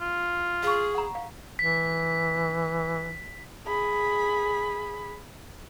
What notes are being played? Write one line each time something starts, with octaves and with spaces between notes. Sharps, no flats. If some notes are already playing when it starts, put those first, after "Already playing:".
F4
G#4 F5 C#6
F#5 A#5
F5
E3 B6
G#4 B5